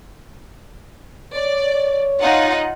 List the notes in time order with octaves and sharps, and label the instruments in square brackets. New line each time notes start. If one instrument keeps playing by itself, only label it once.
[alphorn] C#5 [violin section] D5
[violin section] D#4 F4 F#5